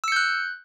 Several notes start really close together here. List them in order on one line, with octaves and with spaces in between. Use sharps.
E6 C#7 G6 F#6